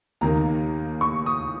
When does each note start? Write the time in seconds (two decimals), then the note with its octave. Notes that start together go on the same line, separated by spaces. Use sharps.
0.21 D#2 D#3 A#3 A#5
1.01 C#6
1.26 D#6